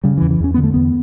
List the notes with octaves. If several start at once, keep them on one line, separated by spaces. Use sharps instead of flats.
C#3 G3
E3
E2
E3
E2 C#4
D3 B3
A3
E2 B3